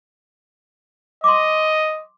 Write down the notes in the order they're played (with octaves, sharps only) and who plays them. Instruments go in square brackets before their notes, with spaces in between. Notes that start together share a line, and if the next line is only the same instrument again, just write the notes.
[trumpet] D#5 [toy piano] C6 D6